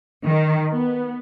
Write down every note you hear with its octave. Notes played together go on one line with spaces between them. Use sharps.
D#3
B3